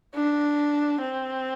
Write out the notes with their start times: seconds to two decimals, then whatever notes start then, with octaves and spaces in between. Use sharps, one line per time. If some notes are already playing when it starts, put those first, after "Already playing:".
0.15 D4
1.01 C4